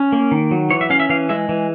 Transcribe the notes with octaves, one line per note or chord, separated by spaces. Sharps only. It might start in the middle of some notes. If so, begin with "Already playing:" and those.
Already playing: C#4
A#3
D#3
F#3
E3 C#5
E5
C#4 F5
E5
E3 F5
G#3 E5
E3